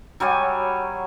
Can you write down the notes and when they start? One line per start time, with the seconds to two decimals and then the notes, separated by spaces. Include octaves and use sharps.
0.20 F#3 G3 C#5 G#5